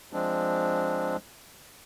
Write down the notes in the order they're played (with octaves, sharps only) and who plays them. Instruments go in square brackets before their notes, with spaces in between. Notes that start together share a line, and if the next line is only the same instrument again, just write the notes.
[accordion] F3 G#3 C4 D4